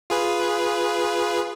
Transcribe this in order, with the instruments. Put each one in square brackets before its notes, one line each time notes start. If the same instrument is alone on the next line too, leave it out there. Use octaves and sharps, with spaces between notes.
[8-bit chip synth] F4 G#4 B4